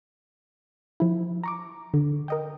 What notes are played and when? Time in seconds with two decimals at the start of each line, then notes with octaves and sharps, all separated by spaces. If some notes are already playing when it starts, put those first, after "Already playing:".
1.00 F3 E4
1.44 A#5 C#6 D6
1.94 D3
2.28 A#4 D#5 G5